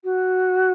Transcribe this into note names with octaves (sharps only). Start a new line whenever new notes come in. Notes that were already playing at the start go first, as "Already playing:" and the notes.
F#4